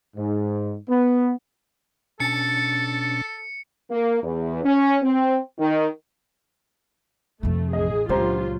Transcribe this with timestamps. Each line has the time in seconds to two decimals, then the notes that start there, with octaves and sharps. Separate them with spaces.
0.16 G#2
0.89 B3
2.20 B2 C#4 D4 A4 A6 C#7
3.90 A#3
4.23 E2
4.63 C#4
5.02 C4
5.58 D#3
7.43 F2 C3 A3
7.73 A1 E2 G#4 D#5
8.09 C#2 A#2 F#3 D4 F4 G4 C5 A#5